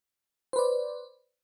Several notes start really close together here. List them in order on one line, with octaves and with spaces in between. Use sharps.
C5 B4 D5